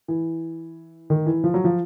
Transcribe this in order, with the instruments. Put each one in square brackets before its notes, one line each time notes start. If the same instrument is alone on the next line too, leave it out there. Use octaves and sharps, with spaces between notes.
[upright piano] E3
D#3
E3
F3
F#3
F3